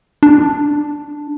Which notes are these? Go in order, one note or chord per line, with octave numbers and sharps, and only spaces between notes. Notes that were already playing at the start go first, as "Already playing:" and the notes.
D4